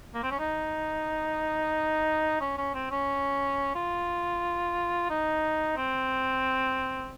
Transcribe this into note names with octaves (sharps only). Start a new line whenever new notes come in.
A#3
C4
C#4
D#4
C#4
C#4
C4
C#4
F4
D#4
C4